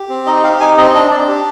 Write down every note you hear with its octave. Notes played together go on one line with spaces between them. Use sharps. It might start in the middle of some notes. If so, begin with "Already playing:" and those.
Already playing: G4
C4
D#4 D#5
G4 F5
D#4 G#5
C4 D#5
D4 D#5
D4 D5
G4